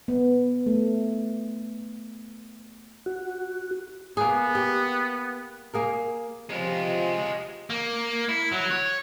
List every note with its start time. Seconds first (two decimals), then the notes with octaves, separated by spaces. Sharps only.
0.08 B3
0.66 A3
3.06 F#4
4.17 A#3 B3 G#4
4.55 G4
5.74 A#3 G#4 A#4
6.50 C3 F3 G#3 F4 G4
7.70 A#3
8.29 E4
8.52 F#3
8.71 C#5